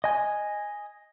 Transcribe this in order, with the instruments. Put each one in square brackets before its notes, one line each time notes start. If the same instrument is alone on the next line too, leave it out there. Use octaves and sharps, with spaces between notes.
[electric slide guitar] D#5 G#5